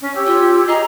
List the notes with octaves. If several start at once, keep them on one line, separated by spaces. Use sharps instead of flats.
C#4
G4 C#5 E6
F4
G#4 D#5 A#5